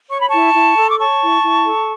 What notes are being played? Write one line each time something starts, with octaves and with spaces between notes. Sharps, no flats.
C#5 C#6
B5
E4 A5 C#6
E4
A4
D6
C#5 A5 C#6
E4
E4
A4